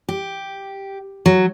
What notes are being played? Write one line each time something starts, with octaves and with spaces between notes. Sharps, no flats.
G4
F#3